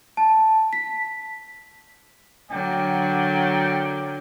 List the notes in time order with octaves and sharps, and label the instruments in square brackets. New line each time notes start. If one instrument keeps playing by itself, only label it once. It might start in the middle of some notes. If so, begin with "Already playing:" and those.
[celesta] A5
B6
[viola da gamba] D3 F#3 [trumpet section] A#4 D5 G5